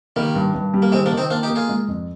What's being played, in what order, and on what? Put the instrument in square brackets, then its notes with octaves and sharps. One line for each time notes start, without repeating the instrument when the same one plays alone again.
[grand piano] D#3 [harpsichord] G3 A#3
[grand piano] G2
G2
G3
[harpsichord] A#3
[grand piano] D#3 [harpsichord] G#3 C4
[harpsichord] A#3 D4
[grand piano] D#3
[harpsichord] C4 D#4
[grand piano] A#3 [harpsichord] D4 F4
[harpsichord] D#4 G4
[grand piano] A#3
[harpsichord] F4 G#4
[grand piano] G#3
F2